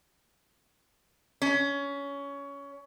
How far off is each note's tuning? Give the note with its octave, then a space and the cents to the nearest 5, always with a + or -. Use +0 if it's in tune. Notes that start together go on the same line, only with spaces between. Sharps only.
C#4 +20